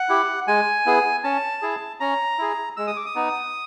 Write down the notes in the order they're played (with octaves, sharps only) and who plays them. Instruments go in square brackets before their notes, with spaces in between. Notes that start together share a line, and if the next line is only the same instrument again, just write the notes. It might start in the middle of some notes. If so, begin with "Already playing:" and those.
Already playing: [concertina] F#5
E4 G4
G#3 G#5
B3 E4 G#4
C#4 A5
E4 G#4
C#4 A#5
E4 G#4
G#3 E6
D#6
D6
D#6
B3 D#4